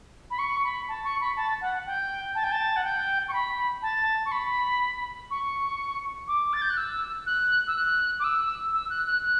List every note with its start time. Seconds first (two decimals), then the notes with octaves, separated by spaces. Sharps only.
0.30 B5
0.38 C#6
0.64 B5
0.88 A5
1.04 C#6
1.20 B5
1.36 A5
1.61 F#5
1.86 G5
2.35 A5
2.43 G5
2.51 A5
2.76 F#5
2.84 G5
3.28 C#6
3.33 B5
3.82 A5
4.25 C#6
4.31 B5
5.30 C#6
6.28 D6
6.53 A6
6.61 G6
6.70 F#6
6.77 E6
7.26 F#6
7.67 E6
7.76 F#6
8.19 D6
8.24 E6
8.73 E6
8.89 F#6
9.06 F#6
9.22 F#6